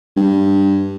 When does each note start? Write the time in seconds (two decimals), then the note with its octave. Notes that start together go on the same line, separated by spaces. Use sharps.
0.17 G2